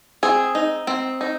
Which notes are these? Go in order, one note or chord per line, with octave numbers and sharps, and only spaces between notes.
C4 G#4
D#4
C4
D#4